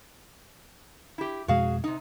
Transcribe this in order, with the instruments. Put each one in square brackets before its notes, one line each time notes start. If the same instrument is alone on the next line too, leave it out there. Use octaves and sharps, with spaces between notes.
[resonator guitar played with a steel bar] E4 G4
[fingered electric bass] F2 B2 G#3 [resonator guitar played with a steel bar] F#4 G#4 F5
[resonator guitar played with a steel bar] C3 D#4